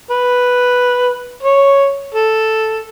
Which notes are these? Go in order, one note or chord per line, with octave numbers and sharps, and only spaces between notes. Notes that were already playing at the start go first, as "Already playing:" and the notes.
B4
C#5
A4